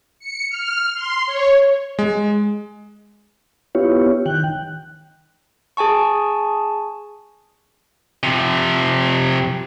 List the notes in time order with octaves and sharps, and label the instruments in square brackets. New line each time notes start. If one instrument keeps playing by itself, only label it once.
[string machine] C#7
F6
C6
C#5
[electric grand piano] G#3
[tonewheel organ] B3 E4 F4 G4 C#5
D#3 G5 F#6
[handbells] G#4 G#5 A5 C#6
[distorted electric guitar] C3 F3